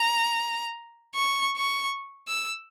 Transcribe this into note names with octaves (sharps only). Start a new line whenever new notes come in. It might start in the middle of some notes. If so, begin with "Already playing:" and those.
Already playing: A#5
C#6
C#6
E6